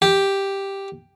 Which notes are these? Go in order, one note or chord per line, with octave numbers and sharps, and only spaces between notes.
G4